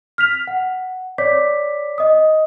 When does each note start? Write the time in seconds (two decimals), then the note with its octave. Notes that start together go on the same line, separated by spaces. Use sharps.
0.18 F6 B6 F7
0.47 F#5
1.18 C#5 D5 D6 B6
1.98 D#5 D#6